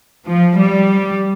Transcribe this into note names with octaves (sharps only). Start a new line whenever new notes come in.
F3
G3